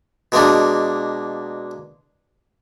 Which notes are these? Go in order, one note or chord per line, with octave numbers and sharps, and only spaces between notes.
B2 G#3 A#3 D4